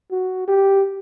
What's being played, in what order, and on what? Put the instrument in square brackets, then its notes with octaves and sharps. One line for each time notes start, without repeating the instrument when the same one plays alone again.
[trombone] F#4
G4